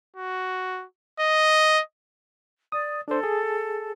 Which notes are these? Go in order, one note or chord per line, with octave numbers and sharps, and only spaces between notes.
F#4
D#5
D5 D#6
D4 A4 C5
G#4